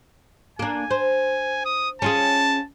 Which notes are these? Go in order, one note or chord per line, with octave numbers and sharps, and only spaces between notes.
A#3 D4 G#5
C5
D#6
C#4 F4 G#4 A5